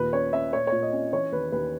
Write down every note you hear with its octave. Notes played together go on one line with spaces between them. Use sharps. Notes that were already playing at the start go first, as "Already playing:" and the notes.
Already playing: D#2 A#2 B4
C#4 C#5
C#4 E5
A#2 C#5
C#5
A#2
D#5
C#4
E3 C#5
D#2 B4
D#2 B4